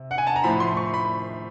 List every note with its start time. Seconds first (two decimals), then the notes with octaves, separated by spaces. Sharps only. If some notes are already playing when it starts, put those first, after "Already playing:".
Already playing: C3
0.11 F#5
0.18 G#5
0.27 A5
0.36 A#5
0.44 A2 F3 B5
0.60 C6
0.77 C#6
0.94 B5